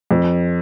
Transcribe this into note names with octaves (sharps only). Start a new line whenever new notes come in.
F2